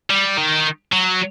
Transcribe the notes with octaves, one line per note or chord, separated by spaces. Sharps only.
G3
D#3
F#3